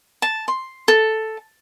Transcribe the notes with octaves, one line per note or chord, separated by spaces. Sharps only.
A5
C6
A4